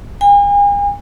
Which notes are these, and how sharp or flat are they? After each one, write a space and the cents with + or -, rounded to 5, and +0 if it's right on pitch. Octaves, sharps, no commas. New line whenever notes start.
G#5 -40